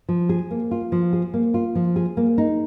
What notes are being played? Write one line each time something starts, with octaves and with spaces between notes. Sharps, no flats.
F3
G#4
A#3
F4
F3
G#4
A#3
F4
F3
G#4
A#3
D#4